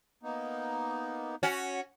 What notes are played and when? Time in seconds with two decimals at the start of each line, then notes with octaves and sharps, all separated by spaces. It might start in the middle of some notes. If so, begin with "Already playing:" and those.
0.23 A#3 B3 D#4
1.43 C#4 F#4